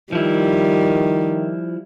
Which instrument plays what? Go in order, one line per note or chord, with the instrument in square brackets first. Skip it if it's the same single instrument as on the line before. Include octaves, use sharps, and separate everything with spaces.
[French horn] D#3 [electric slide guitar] F3 E4 [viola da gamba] G3